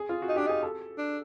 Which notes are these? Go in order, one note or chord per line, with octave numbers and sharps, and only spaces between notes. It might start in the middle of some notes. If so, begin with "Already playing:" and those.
Already playing: G#4
F4
F#4
D#4
D4 G4
D#4 G#4
A4
D4